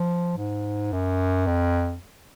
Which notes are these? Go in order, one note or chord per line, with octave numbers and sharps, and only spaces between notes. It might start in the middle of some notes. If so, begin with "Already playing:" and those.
Already playing: F3
G#2
F#2
F2